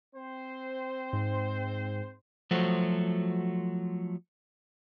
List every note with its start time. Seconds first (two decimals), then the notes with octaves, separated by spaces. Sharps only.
0.16 C4 C5
1.13 G#2
2.51 F3 F#3 A3 F#4 C5